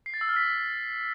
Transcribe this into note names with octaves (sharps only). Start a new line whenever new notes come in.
C7
A6
E6
F6
B6